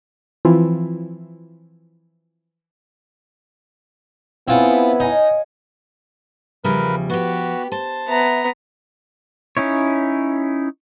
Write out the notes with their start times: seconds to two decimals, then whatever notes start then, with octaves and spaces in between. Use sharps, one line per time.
0.45 E3 F3 C4 E4 F4
4.48 B3 C4 E4 F4 G#4 C#5 F#5 A5
5.00 D#4 D#5 F5 G#5
6.64 E2 C#3 F3 G3 A#4 B4
7.10 B3 F#4 G4
7.72 C5 A5
8.08 B3 E5 A#5
9.57 C#4 D#4 E4 C#5